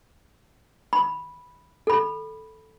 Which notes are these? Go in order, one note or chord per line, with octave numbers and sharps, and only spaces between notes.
B5
A4 B5